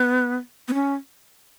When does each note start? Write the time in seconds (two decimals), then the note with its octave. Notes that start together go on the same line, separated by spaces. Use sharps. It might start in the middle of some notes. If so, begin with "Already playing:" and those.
Already playing: B3
0.68 B3
0.74 C#4